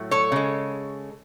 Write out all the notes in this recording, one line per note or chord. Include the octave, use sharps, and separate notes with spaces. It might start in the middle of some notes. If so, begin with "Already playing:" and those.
Already playing: A2 F#3 A3
A4 C#5
C#3 G#3